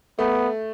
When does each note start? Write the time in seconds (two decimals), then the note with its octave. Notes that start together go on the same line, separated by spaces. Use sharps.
0.19 A3 B3